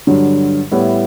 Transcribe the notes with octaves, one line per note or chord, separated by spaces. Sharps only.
G2 D3 F#3
A2 G3 B3 E4